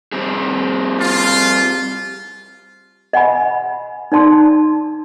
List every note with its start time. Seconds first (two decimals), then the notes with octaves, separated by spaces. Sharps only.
0.12 G3 C4 G#4
1.00 F4
3.13 D#5 F#5 G#5 B5
4.12 D#4 D5 A5 C6 D#6